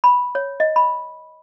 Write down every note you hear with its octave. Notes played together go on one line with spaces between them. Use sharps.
B5
C#5
D#5
B5